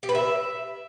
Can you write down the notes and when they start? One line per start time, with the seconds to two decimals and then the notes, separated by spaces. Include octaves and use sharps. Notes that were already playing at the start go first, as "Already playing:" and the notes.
0.03 G4
0.09 B4
0.15 E5